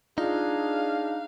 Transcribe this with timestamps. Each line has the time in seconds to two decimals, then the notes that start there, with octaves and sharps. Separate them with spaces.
0.18 D4 D#4 F4 G#4 D#5 F5